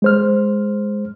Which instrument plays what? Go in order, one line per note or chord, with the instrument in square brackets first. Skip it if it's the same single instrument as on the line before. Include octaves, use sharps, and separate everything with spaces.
[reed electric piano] G#3 C5 F6